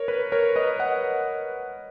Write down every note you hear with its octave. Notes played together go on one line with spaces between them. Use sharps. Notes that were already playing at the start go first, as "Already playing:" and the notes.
Already playing: A#4 C#5
B4
A#4 C#5
B4 D#5
D#5 F#5